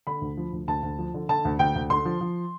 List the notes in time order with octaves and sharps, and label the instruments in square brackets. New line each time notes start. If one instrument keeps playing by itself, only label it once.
[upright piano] D3 B5
D2
F3
D2
D2 A5
D2
F3
D3
D3 A5
D2
D2 G5
D2
D3 C6
F3
F3